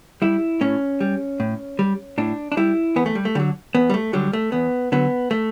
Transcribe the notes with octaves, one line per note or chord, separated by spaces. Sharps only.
G3 E4
A2 C#4
G3
A2
G3
A2 D4
D4
G3 E4
E2 B3
A3
G3
A3
D3 F#3 G3
E2 B3
G3
A3
D3 F#3 G3
A3
E2 B3
D3 F#3 B3
A3